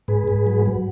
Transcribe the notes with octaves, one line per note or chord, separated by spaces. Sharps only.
G#2 G#4 B4
G#2
F#3
F#3